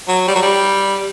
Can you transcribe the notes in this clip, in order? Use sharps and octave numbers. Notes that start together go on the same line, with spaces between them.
F#3
G3
F#3
G3